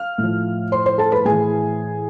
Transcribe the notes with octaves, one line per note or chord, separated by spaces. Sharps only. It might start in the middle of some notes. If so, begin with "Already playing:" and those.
Already playing: F5 F6
A2
F3
C5 C6
C5 C6
A4 A5
B4 B5
A2 E3 G#4 G#5